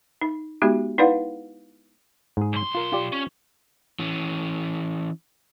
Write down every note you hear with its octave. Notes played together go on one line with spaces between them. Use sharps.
D#4
G#3 B3 D#4 F#4 G4
D#4 E4 B4 D5 F5 F#5
G#2 G#4
B1 C6
F4 A#4
F4 G4 D5
C#4
E3 C#4